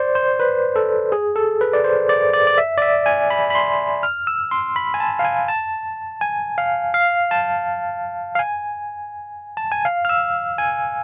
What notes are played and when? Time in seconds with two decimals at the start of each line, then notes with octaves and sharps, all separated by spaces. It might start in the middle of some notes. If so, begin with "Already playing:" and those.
Already playing: C5 D5
0.15 C5
0.40 B4
0.76 A4
1.12 G#4
1.36 A4
1.61 B4
1.73 D5
1.84 C5
2.09 D5
2.33 D5
2.47 D5
2.58 E5
2.78 D5
2.82 E5
3.06 G#5
3.30 B5
3.50 B5
3.55 C6
4.03 F6
4.27 E6
4.51 C6
4.76 B5
4.94 G#5
5.00 A5
5.19 F5
5.25 G#5
5.48 A5
6.21 G#5
6.58 F5
6.94 F5
7.31 A5
8.35 F5
8.39 G#5
9.57 A5
9.72 G#5
9.85 F5
10.05 F6
10.09 E6
10.58 G#5